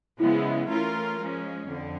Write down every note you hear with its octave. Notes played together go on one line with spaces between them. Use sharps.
C#3 F3 G#3 B3 E4
E3 A3 C#4 F4 A#4
F3 G#3 C#4
F2 D3